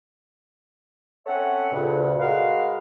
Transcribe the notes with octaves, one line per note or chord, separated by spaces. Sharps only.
C4 C#4 A4 C#5 E5 F#5
D2 G2 A#2 C#3
G#3 F#4 A#4 B4 F5